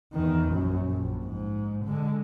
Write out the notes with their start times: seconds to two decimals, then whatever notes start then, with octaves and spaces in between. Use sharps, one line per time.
0.14 E2 D#3
0.50 A#1 F#2
0.86 A#1
1.25 G#2
1.85 D3 G#3